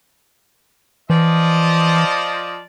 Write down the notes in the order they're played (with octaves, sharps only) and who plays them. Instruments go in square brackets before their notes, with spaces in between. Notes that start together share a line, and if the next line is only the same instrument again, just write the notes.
[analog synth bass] E3 [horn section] F3 D5 D#5